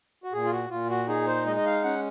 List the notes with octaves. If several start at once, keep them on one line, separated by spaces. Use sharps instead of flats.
F#4
A#2 G#4
F4
F#4
A#2 F4
F#4
D#4 G#4
C5
G#3 D#5
D#5
F5
C#4 F#5